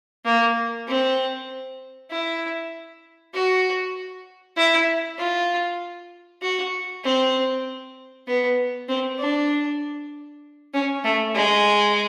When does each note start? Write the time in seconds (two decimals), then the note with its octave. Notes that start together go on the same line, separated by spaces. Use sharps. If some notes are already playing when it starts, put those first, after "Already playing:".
0.25 A#3
0.87 C4
2.10 E4
3.34 F#4
4.56 E4
5.18 F4
6.42 F#4
7.04 C4
8.27 B3
8.88 C4
9.19 D4
10.73 C#4
11.04 A3
11.35 G#3